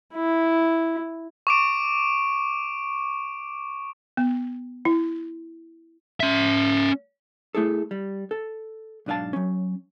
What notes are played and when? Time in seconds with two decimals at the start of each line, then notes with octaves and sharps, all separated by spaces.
0.14 E4
1.47 C#6 D6 D7
4.17 B3
4.85 E4
6.20 C#4 E5
7.55 A3 E4 G#4 A4
7.91 G3
8.31 A4
9.06 B1 G#2 D4 D#5 F5 A5
9.33 F#3 C#4